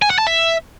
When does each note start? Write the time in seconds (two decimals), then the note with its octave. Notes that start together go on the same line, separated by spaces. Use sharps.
0.02 G#5
0.10 F#5
0.19 A5
0.27 E5